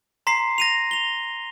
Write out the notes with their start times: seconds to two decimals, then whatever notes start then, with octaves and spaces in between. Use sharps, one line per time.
0.27 A#5 C6 B6 C7
0.58 A#6 D#7 F7
0.91 F7 G7